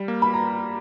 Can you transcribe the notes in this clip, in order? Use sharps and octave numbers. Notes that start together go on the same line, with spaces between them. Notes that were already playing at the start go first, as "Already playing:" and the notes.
Already playing: G3
A#3
B5
A#5